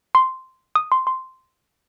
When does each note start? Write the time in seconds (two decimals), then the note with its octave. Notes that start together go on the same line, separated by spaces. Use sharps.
0.15 C6
0.76 D#6
0.92 C6
1.07 C6